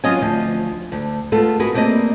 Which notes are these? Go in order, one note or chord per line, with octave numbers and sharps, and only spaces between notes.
F#3 C#4 F4 D#5 F5 G#5
D2 F3
D2
G#3 A3 B3 F4 A4
B3 F#4 G#4 A#4 B4
A3 A#3 C4 D5 D#5